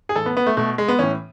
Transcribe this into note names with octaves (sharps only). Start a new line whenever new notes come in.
G#4
A2 E3 A4
B3
B3
A3
B2 A3
G#3
B3
A2 E3 C#4